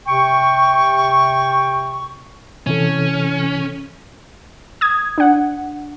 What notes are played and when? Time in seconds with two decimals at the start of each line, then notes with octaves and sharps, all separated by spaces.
0.07 C3 G5 C#6
2.67 C3 E3 C#4 A4
4.81 D#6 G#6
5.18 D4 F#5